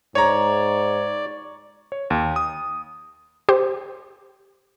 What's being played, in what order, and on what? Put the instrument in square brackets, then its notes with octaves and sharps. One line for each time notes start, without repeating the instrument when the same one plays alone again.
[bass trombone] G#2 [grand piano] C#5 A#5 [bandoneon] D5
[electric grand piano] C#5
D#2
D#6
[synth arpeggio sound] G4 C5